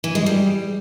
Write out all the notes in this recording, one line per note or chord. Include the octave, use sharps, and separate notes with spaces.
E3
G#3
G3